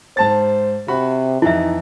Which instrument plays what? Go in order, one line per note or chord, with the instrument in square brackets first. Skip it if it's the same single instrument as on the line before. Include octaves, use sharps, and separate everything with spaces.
[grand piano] G#2 A5 A6 [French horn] C5
[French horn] C3 [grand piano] F#4 B5
[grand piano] F2 E3 [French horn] D#4 [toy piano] E4 E5